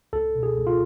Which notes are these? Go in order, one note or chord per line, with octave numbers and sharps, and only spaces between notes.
C#2 A4
B2
G#4
C#2
F4